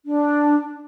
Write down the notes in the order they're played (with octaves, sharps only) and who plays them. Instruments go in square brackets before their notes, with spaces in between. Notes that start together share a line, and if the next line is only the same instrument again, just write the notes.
[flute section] D4